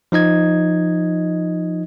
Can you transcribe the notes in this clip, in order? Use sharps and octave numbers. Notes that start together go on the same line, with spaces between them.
F3 D#4 D#5 G#6